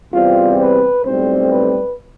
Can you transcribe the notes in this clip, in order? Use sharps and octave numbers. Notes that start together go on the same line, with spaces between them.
E2 C3 G3 C4 F4
B4
B1 A2 G3 C4 C5
B4